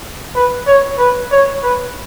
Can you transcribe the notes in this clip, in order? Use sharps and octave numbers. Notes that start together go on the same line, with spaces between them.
B4
C#5
B4
C#5
B4